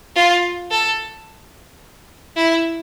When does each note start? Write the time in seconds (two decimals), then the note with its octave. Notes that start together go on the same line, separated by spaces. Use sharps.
0.16 F4
0.71 A4
2.36 E4